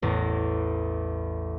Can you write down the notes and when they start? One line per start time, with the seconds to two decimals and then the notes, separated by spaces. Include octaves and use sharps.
0.02 A1 E2 A#6